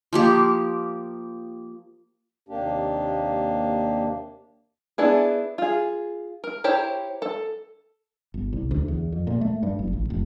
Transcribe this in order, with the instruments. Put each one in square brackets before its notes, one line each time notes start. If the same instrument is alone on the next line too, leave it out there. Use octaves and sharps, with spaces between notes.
[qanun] F3 A#3 G4
[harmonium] D#2 C3 A#3 D4 G4
[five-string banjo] B3 D4 E4 G#4
F4 G#4
A#4
E4 G4 C5 C#5 A#5
A4
[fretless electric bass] G1
C2
D2
E2
F2
A#2
A3
G2
F#1
A1
F1